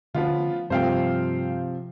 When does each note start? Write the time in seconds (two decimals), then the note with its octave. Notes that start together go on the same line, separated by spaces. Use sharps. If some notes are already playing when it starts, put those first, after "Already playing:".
0.14 D3 F3 A3 B3 C#4 F4
0.70 G2 C3 F3 A3 C5 F5 G5